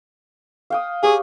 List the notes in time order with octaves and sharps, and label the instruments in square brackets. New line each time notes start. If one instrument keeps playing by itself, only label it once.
[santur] F5 G5 D#6
[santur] G4 C#5 [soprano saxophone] G#4